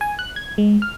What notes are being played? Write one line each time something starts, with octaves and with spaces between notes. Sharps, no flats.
G#5
F#6
G#6
G#3
F6